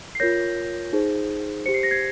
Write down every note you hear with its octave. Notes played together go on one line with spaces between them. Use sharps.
C7
F4 A#4 C#5 G6 A#6
D#4 G#4 C5
G4 C5 C#7
C7
A#6
G#6 C7